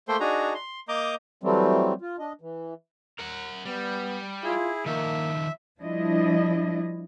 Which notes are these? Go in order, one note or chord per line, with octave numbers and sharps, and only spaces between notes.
A3 A#3 A4 C5 G5 C6
D4 D#4 F#4 G#4 A#5
C6
A#3 D#5 A#5 D6 D#6 G6
E3 F#3 G3 A3 C4
F4
D4 D#5
E3
A#4 F#5
G3 B3
E4 F4 G#4
D#3 F3 A#3 E5
F3 G3 D4 E4 D#5